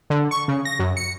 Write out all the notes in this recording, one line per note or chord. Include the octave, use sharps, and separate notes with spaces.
D3
C#6
C#3
A#6
F#2
C#7